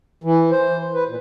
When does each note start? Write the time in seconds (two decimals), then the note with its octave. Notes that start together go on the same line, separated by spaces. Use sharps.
0.24 E3
0.51 C5
0.94 B4
1.07 A#2